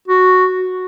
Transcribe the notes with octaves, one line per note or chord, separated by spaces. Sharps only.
F#4